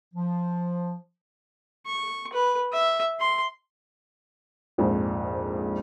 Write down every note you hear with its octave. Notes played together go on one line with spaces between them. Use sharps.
F3
C#6
B4
E5
C6
A#1 F2 G#2